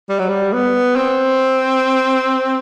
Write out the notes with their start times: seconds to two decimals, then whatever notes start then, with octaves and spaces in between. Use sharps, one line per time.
0.09 G3
0.19 F#3
0.29 G3
0.53 B3
0.96 C4